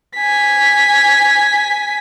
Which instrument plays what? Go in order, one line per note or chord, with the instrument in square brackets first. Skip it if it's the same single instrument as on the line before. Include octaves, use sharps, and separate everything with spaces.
[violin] G#5 B6